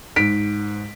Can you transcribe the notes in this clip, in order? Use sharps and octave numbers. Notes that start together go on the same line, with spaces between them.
G#2 B6 D7